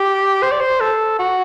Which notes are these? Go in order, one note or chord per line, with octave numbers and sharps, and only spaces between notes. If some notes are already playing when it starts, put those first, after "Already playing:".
Already playing: G4
C5
D5
C5
A4
F#4